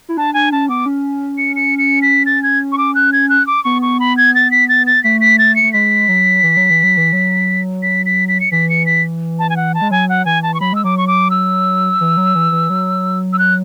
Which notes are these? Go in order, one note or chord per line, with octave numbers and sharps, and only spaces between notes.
E4
D4 A5
D4 G#5
C#4 A5
B3 D6
C#4
C#7
C#7
C#7
B6
A6
G#6
C#6
D6
F#6
G#6
F#6
D6
B3 C#6
C#6
B5
G#6
A6
B6
A6
A6
A3 B6
B6
A6
C#7
A3
G#3 B6
F#3
E3
F#3
E3
F#3
E3
F#3
B6
B6
B6
C#7
E3 B6
C#7
B6
A5
G#5
F#5
A5
G#3
F#3 G#5
F#5
E3 G#5
A5
C#6
F#3 B5
G#3 E6
F#3 D6
C#6
D6
E6
E3
F#3
E3
E3
F#3
E6
F#6